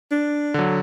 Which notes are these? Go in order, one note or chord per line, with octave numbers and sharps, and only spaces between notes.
D4
D3 F#3